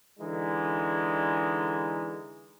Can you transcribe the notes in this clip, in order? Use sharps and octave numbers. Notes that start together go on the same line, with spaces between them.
D3 E3 G#3 D#4